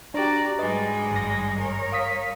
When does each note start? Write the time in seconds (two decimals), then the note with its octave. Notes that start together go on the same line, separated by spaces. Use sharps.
0.14 D4 F#4 G4 D5 A#5
0.58 G#2 G3 G#3 B4 D#5 A6
1.12 G#1 G2 A#6
1.57 G3 A#4 C#5
1.92 F5 D#6 B6